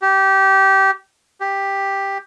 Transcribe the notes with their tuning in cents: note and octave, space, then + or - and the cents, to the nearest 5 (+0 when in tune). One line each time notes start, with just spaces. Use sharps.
G4 -20
G4 +5